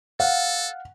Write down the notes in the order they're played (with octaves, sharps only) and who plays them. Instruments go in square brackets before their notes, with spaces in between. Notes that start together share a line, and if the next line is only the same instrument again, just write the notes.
[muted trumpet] A4 [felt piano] F5 F#5